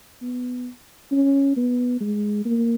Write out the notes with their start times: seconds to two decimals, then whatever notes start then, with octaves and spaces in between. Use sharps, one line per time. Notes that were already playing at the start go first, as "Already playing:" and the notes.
0.22 B3
1.12 C#4
1.56 B3
2.00 G#3
2.45 A#3